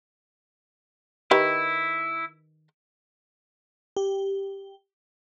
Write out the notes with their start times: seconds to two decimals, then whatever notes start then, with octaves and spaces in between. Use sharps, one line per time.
1.31 D#3 E4 G4 B4
3.97 G4